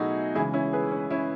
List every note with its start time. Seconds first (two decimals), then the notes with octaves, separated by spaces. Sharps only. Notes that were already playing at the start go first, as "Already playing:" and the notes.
Already playing: B2 F#3 A3 D#4 E4 F#4 G#4
0.35 C#3 E3 G#3 E4 G#4
0.53 C#4 E4
0.73 G#4 B4
0.92 C#4
1.10 C#4 E4